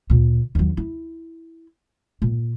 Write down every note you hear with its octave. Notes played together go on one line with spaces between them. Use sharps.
D2 A#2
D#2 F#3
E4
A#2